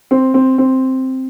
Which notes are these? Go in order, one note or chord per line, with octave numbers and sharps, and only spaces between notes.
C4
C4
C4